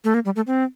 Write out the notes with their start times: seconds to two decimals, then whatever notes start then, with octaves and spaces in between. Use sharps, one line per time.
0.04 A3
0.14 A#3
0.25 G3
0.36 A3
0.47 C4